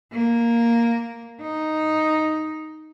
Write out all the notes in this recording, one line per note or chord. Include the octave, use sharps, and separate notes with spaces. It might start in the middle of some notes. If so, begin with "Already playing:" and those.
A#3
D#4